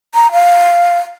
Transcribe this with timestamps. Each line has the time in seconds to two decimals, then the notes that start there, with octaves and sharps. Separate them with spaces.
0.14 A#5
0.32 F5